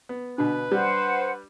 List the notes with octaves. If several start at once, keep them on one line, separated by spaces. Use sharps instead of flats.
B3
B2 D3 D4 B4
G3 C5 F#5